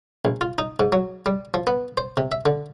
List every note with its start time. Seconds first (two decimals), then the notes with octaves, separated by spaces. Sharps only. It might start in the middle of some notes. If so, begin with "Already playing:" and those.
0.25 A#1
0.41 F4
0.58 D#4
0.80 G#2
0.92 F#3
1.26 G3
1.54 F3
1.67 B3
1.97 C5
2.17 C3
2.32 E5
2.46 D3